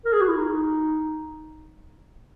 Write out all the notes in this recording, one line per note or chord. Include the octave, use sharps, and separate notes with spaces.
A#4
G#4
F#4
E4
D#4